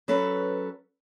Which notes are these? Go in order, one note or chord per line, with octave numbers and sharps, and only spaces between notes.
F#3 C#4 A4 B4